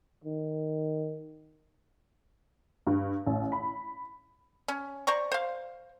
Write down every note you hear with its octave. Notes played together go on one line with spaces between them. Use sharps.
D#3
G2
A1
B5
C#4
C5 D5 A#5 C#6
C5 F5